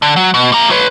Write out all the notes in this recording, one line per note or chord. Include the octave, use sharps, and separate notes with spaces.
D3
F#3
B2
G3 A#5
B4 C#5